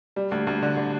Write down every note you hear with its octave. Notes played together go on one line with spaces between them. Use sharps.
G3
D2
D2
D3
D3